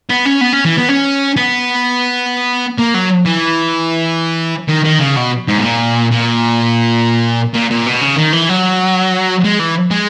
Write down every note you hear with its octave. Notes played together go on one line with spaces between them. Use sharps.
B3
C#4
B3
C#4
E3
B3
C#4
B3
A#3
F#3
E3
D#3
D#3
C#3
B2
G#2
B2
A#2
A#2
A#2
A#2
B2
C#3
D#3
E3
F#3
G#3
E3
G#3